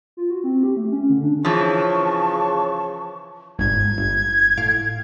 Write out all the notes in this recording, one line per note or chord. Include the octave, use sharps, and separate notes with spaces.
F4
F#4
C4
G4
A3
C#4
D3
D4
C#3 E3 F3 A5 C#6
G1 G#2 G#6
G1
A2 F5 D7